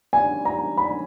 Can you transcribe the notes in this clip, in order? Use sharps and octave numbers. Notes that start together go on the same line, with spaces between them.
G#5
A#5
B5